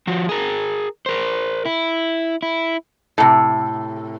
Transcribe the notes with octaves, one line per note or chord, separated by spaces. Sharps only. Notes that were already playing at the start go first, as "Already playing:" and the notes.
F3 F#4
G#4 A#4
A#4 C5
E4
E4
A2 C3